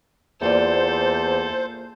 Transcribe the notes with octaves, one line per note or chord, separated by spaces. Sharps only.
E2 A#3 F4 A4 C5 D5